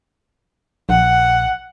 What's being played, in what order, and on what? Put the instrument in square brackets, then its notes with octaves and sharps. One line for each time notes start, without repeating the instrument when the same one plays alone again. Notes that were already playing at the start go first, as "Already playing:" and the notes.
[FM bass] A#1 [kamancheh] F#5